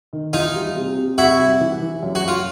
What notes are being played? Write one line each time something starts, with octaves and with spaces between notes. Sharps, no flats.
D#3
E3 D#4 F4
G3
C3
C3
C3 E4 F#4
G3
E3
E3
F#2
F#4
F#2 F4